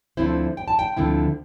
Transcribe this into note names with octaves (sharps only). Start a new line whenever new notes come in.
D2 D3 F3 C4 E4 C5
G5
A5
G5
D2 D3 F3 C4 E4